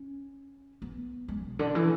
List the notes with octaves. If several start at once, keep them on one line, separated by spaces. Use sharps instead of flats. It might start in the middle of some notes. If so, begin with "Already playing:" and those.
Already playing: C#4
B3
G#3
B2
D3
E3